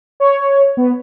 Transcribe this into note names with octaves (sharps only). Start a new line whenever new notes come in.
C#5
B3